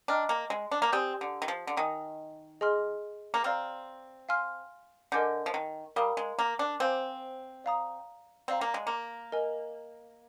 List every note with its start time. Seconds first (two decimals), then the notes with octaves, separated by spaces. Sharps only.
0.08 D4 D#5 G5 A#5 F6
0.29 A#3
0.50 G#3
0.71 D4
0.82 A#3
0.93 C4 G4 D5 G#5 D#6 G6
1.21 D3
1.42 D#3
1.48 F3
1.67 D3
1.77 D#3 D#5 G#5 D#6
2.61 G#4 D#5 G#5 C6 F6
3.34 A#3
3.44 C4 D5 F5 A#5 F6
4.29 F5 G#5 C6 F6
5.12 D3 A#4 D#5 G#5 D6 G6
5.46 F3
5.54 D#3
5.96 G3 A#4 F5 A#5 D#6
6.17 G#3
6.39 A#3
6.59 D4
6.80 C4 C5 F5 G#5 D6 G6
7.64 D5 F5 A#5 D#6
8.48 C4 D5 F5 A#5
8.61 A#3
8.74 G#3
8.87 A#3
9.32 A#4 D#5 G#5